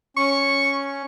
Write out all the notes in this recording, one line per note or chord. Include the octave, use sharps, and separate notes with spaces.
C#4 C#6